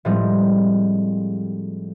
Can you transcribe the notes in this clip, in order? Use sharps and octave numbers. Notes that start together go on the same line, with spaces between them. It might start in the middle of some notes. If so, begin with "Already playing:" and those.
A2 F3 G3 G#3 C4